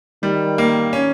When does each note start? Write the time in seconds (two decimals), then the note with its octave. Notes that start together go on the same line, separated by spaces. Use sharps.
0.23 D#3 G3
0.58 A#3
0.93 C#4